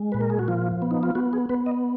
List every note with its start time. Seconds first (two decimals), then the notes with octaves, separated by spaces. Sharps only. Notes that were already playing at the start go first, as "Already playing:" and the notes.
Already playing: G#3
0.12 A#2 B4
0.21 A#4
0.30 G#4
0.39 F#4
0.48 F3 F4
0.82 B3
0.91 D#4
1.03 F4
1.15 B3 F#4
1.33 G#4
1.49 B3 B4
1.66 D#5